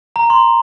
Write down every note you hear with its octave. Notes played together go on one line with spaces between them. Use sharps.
A#5
C6